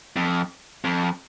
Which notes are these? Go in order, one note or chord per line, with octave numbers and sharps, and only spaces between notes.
F2
F2